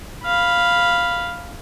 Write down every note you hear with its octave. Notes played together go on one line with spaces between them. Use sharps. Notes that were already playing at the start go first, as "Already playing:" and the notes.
F5 B5